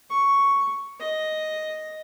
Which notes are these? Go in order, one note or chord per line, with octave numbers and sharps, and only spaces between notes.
C#6
D#5